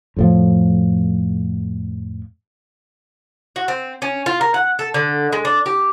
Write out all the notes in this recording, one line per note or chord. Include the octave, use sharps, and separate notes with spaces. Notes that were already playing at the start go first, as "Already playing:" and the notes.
F2 A2 F3
F#4
C4
C#4
F4
A#4
F#5
A4
D3
G#3
D4
G4